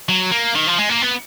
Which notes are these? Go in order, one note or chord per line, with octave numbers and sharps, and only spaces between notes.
F#3
A#3
D#3
F3
G#3
A#3
B3